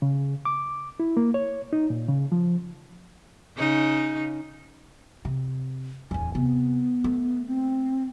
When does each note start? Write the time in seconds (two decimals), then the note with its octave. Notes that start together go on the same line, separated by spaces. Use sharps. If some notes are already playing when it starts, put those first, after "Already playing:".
0.02 C#3
0.45 D6
1.00 E4
1.17 A#3
1.34 C#5
1.73 D#4
1.90 A#2
2.08 C#3
2.32 F3
3.57 C#3 D#4
5.25 C3
6.11 D1 E2 G#5
6.35 C3 B3
7.04 A3
7.46 C4